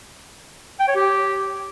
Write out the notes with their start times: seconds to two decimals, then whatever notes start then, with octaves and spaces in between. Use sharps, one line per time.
0.80 G5
0.88 C#5
0.96 G4